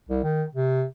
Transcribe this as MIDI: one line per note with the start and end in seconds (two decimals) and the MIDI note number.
0.09 0.22 36
0.24 0.44 51
0.55 0.84 48